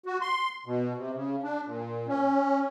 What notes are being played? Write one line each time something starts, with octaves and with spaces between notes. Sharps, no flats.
F#4
C6
B2
C3
C#3
D4
A#2
C#4